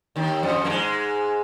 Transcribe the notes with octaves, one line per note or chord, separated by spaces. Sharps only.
D#2 D#3
F2 F3
A#3
G#2 G#3